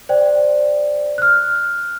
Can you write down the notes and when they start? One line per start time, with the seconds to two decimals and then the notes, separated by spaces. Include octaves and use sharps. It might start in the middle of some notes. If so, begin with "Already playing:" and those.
0.09 C5 D5 G5
1.18 F6 F#6